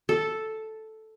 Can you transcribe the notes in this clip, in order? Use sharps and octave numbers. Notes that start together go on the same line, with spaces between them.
A4